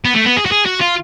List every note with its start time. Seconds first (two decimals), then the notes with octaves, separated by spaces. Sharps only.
0.05 B3
0.14 A3
0.25 B3
0.37 G#4
0.46 F#4
0.52 G#4
0.66 F#4
0.81 F4